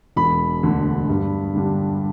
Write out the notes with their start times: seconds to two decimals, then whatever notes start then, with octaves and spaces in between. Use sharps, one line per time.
0.16 E1 B5
0.63 D2 D3
1.09 G2
1.55 D3 G3 D4